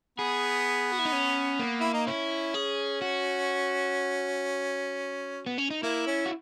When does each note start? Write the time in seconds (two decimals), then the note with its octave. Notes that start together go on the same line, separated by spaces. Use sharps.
0.19 B3 G#4
0.92 F#4
0.99 E4
1.05 D#4
1.12 C#4
1.59 A#3
1.80 E4
1.93 D#4
2.07 C#4 E4
2.54 G#4
3.02 F#4
5.46 B3
5.58 C#4
5.70 D#4
5.83 A#3 E4
6.07 C#4
6.26 F#4